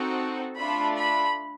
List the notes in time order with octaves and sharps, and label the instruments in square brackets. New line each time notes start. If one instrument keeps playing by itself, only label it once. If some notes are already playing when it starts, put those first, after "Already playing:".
Already playing: [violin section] C4 D#4 F#4 A4
A3 D4 F4 B5
B5